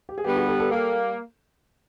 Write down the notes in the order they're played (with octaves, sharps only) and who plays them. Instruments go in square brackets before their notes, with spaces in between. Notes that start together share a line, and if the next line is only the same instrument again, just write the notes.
[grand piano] G4
G#4
[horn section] G2 D3 G3 B3 [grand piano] G4
[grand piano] F#4 G#4
G4 A4
G4 A4
[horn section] G3 A#3